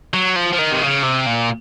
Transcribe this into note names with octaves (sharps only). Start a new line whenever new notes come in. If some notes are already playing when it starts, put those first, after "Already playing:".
F#3
F3
F3
D#3
C3
C#3
C3
A#2